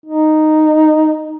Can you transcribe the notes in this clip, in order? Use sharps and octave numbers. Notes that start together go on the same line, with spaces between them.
D#4